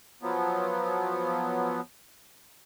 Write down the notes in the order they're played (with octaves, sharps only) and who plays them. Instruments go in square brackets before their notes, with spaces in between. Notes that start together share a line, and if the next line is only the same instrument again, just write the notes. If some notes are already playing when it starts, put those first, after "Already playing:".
[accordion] F3 F#3 B3